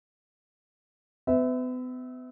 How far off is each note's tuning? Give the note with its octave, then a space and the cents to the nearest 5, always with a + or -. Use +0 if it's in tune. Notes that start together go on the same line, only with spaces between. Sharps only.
B3 +40 E5 -15